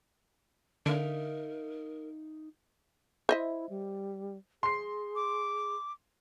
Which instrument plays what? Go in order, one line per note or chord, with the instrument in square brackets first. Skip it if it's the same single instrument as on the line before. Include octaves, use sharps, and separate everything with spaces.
[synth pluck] D3 [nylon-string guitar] D#4 E5 F5 [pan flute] A#4
[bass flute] E4 [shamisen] C5 D#5 E5
[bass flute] G3
[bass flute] G#4 [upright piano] C6 C7
[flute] D6